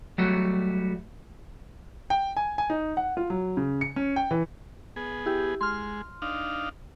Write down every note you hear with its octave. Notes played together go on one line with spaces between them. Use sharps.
F#3 G3 A3 F#4
G5
G#5
G#5
D#4
F#5
F4
F#3
C#3
C#7
C#4
G5
E3
B3 G#4
E4 G4
G#3 C6 F6
D4 D#4 F5